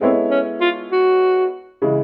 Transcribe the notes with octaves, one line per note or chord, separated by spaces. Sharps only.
G#3 B3 C4 E4 A4 C#5
C#4
F4
F#4
C#3 E3 G#3